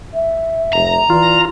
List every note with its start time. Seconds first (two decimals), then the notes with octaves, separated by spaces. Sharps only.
0.13 E5
0.73 F1 A#5
1.10 E3 F4 D5